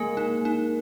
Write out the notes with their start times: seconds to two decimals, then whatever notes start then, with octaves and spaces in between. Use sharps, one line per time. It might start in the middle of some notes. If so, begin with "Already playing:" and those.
Already playing: G#3 A#3 A#4
0.17 D#4
0.45 D#4